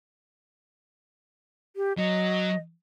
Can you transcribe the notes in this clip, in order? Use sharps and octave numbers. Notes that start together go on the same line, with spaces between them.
G4
F#3 D#5